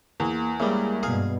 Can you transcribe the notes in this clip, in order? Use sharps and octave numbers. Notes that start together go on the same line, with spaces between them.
E2 A#3
C#3 G3 G#3 A#3 E5
G2 B2 G#4 F5 G#5